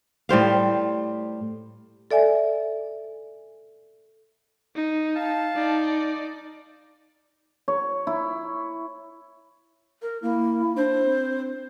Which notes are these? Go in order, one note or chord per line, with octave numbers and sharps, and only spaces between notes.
A2 G3 C5 F5
A4 D5 E5 G#5
D#4
F5 A5
D#4 D5
C#5
E4
A#4
A#3 E4
D4 C5
C4